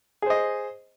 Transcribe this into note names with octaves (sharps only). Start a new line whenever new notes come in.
G#4 C5 D#5